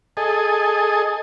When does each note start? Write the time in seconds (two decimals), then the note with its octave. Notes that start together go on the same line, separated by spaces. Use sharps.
0.17 G#4 A4 D#5